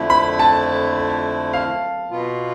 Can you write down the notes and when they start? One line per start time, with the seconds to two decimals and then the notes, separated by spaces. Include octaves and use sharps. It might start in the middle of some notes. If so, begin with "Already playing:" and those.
Already playing: F2 D3 F3 A3 E4
0.10 B5
0.39 A5
1.53 F5
2.11 B2 B3 F4